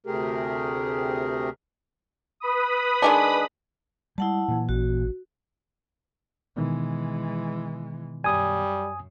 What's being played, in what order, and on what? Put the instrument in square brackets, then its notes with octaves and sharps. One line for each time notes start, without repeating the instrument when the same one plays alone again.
[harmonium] D2 C3 A3 G4 G#4 A#4
[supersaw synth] B4 B5 D#6
[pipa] D#3 G#3 D4
[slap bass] G3 G#3 [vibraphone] E4 F#5 A5
[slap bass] A#2 E3
[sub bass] A1 [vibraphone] F#4
[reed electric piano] B2 D#3 B3 [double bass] E3 G#3
[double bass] F#2 [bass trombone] G3 [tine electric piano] G#5 D#6